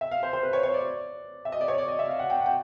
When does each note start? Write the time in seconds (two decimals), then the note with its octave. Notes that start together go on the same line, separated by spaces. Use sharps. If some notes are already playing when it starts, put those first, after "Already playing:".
0.01 E5
0.11 F5
0.23 C5
0.33 C5
0.43 B4
0.53 C#5
0.63 C#5
0.74 D5
1.45 E5
1.52 D#5
1.61 D5
1.68 C#5
1.78 D5
1.88 D#5
1.99 E5
2.09 F5
2.19 F#5
2.30 G5
2.40 F#5
2.46 G5